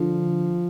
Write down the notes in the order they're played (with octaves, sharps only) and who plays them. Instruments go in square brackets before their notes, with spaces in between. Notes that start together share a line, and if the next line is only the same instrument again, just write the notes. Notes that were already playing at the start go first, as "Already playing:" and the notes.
Already playing: [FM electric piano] D3 [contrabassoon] F3